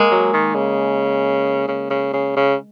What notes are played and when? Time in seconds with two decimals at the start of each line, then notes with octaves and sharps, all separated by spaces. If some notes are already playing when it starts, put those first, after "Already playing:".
Already playing: G#3 A#3
0.11 F#3
0.33 D#3
0.55 C#3
1.68 C#3
1.90 C#3
2.13 C#3
2.36 C#3